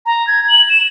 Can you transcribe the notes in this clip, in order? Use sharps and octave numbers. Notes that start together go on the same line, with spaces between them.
A#5
G#6
F#7
E7